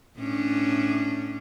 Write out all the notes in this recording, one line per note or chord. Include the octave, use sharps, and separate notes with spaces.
A2 C#4 D4